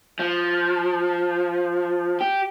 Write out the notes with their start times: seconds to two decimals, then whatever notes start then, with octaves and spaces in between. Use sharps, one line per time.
0.19 F3
2.21 G4